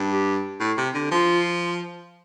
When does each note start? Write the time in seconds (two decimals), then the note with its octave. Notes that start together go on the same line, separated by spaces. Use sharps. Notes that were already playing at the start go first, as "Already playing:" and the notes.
Already playing: G2
0.10 G4
0.60 A2
0.78 C3
0.95 D3
1.11 F3 F4